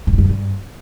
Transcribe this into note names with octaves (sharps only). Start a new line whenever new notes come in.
A2
G#2
F#2
A2
G2